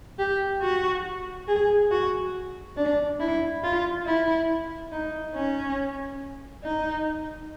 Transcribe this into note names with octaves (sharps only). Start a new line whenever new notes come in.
G4
F#4
G#4
F#4
D4
E4
F4
E4
D#4
C#4
D#4